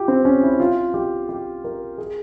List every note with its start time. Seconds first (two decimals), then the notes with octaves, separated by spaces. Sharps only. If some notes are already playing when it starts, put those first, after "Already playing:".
Already playing: F4 G4
0.08 C4
0.25 C#4
0.43 E4
0.60 F4
0.94 G4
1.29 G4
1.64 A#4
1.98 G#4